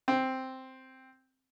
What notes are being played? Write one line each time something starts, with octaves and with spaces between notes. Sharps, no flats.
C4